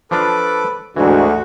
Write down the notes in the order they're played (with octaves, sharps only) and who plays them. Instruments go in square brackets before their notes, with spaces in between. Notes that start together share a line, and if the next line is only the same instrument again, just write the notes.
[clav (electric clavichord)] F3 D4 F4 [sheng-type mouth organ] A4 B4 D6
[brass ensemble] D2 [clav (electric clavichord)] G#2 E3 [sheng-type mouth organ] F#4